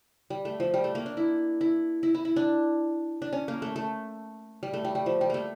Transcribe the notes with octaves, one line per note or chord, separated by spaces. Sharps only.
G3
A3
F3
G3
A3
A#3
D4
E4
E4
E4
E4
E4
D4
D4
C#4
A#3
A3
A3
G3
A3
G3
G3
F3
G3
A3 A#3